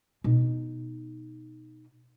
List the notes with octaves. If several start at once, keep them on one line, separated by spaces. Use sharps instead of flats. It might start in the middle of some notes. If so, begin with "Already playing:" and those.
B2 D#4